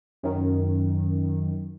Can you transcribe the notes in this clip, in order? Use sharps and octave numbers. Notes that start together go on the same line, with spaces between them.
F#2 D#3